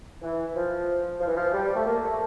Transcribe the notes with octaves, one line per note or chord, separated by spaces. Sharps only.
E3
F3
F3
E3
F3
G3
A3
A#3
A3